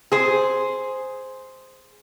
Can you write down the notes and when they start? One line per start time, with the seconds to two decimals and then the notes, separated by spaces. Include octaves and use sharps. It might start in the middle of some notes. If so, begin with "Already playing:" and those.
0.12 G#4 C5